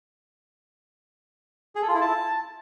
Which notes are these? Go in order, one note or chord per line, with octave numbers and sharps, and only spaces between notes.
G#4
A4
F4
E4
A5